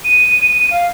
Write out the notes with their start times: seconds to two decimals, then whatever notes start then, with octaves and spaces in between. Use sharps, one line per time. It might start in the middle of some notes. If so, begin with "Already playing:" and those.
0.04 D#7
0.71 F5